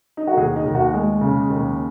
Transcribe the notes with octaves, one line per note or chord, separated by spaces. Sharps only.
D#4
F#4
D#2 G#4
D#4
D#2
F#4
G#3
C#3
D#2